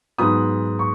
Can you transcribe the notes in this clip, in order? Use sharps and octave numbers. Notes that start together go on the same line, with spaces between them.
G#2 F#3 B3 B5 D#6
C#6